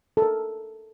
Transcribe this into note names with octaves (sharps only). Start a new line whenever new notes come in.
A4
A#4